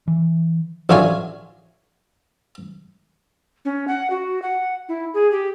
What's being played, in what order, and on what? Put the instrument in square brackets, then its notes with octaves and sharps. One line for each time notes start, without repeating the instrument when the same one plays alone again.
[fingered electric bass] E3
[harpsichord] A1 D3 D4 F4 C#5 G#5
[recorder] C#4
F#5
F#4
F#5
E4
G#4
G4